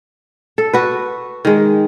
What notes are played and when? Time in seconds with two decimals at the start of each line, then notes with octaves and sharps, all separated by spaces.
0.58 A4
0.73 F#4 B4
1.45 D#3 G#3